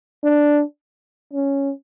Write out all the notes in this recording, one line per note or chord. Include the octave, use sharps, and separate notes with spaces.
D4
C#4